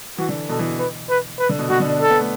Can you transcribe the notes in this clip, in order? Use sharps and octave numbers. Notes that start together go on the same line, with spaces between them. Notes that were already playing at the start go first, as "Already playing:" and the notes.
E3 F#4
D3
B2 A4
E3
B4
B4
B4
D3
B2
B2 F#4
D3
D4
D4 A4
B3
A3